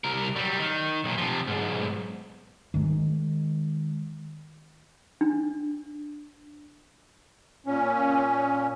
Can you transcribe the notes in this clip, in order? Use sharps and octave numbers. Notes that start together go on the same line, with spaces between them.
C2 A#4
F#3 G3
D#3
B1 A#2
C3 F3
B1 G#2
D#3 G#3
D4
A#2 C#4